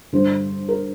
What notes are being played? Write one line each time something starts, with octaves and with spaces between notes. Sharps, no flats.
G2 D3 G3 C5
A#4